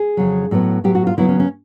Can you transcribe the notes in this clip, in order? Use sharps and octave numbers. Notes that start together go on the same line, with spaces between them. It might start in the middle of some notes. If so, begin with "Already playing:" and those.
Already playing: G#4
F2 C#3 F#3
A2 F#3 B3
A2 F#3 B3 G4
F#4
F4
D#2 C#3 F#3 B3 E4
C#4
C#4